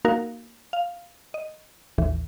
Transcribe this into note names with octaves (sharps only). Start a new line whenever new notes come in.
A#3 D#4 F#4 A#4 F5
F5
D#5
A1 D#2 A2 E3